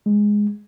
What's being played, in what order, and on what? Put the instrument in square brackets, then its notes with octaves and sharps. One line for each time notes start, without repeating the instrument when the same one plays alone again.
[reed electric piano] G#3